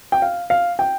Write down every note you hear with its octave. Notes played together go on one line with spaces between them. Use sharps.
G5
F5
F5
G5